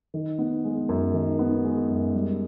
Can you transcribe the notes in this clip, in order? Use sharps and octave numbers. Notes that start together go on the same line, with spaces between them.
D#3
B3
G#3
F#2
D#3
B3
G#3
F#2
G3